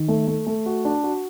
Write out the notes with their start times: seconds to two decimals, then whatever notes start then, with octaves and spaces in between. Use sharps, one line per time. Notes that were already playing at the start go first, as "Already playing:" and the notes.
Already playing: D#3
0.08 A3
0.28 A3
0.47 A3
0.66 F#4
0.85 D4
1.04 F#4